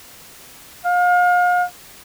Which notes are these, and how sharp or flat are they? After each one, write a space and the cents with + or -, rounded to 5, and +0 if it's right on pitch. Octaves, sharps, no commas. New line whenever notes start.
F5 +35